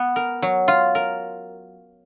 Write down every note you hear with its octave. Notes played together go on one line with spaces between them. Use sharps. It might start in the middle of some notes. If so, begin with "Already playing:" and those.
Already playing: B3
A#4
F#3
F4
A#4